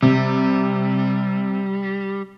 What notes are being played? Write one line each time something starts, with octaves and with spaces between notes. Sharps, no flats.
C3 G3